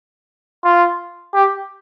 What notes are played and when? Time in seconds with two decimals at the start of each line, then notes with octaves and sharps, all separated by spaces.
0.65 F4
1.34 G4